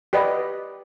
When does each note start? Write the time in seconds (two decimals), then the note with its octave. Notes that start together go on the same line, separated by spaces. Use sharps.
0.13 G4 B4 D5 D#5 F#5